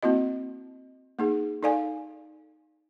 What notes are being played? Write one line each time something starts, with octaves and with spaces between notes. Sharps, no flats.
A#3 C4 E4 F#4 D#5
A#3 D#4 G#4
D#4 A4 D5 F5 G#5